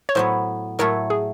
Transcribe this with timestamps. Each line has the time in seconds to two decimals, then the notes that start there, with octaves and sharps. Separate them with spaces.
0.09 C#5
0.15 A2 F#3 B3 C5
0.79 A2 F#3 A3 A#4
1.10 G#4